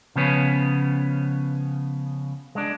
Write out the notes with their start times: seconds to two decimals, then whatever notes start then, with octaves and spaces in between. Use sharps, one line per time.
0.16 C#3 F3 B3 C#4
2.55 G#3 D4